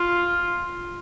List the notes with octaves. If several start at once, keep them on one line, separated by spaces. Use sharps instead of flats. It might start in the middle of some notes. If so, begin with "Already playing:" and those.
Already playing: F4